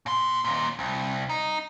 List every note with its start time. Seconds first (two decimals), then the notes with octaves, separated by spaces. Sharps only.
0.06 A#2 C6
0.45 D#2 A#2
0.79 C2
1.29 D#4